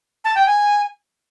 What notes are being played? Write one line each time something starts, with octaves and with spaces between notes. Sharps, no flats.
A5
G5
G#5